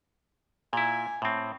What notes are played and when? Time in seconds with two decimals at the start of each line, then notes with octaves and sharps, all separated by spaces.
0.73 A#2 E4 G#5
1.22 A2 C4